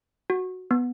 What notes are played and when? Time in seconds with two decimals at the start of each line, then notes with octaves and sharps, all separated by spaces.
0.30 F#4
0.71 B3